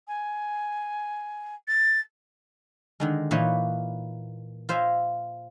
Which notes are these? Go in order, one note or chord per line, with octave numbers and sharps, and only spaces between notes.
G#5
A6
D3 D#3 G#3
A#2 E3 A#3 D#4 B4 C#5
F4 C5 D#5 E5 G#5